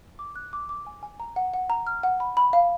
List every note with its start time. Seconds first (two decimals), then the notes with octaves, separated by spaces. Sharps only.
0.19 D6
0.36 F#6
0.53 D6
0.69 D6
0.86 G#5
1.03 G#5
1.20 A#5
1.36 F#5
1.54 F#5
1.70 A#5
1.87 F6
2.03 F#5
2.20 B5
2.37 B5
2.53 F5